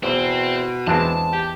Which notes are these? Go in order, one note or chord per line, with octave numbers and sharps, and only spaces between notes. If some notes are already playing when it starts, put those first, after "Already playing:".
E2 B2 C4 C5
E2 G#3 B3 C4 D4 A5
G4